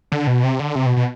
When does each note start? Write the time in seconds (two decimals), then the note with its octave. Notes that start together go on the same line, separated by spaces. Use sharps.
0.12 D3
0.27 B2
0.44 C3
0.60 D3
0.75 C3
0.86 B2
0.97 B2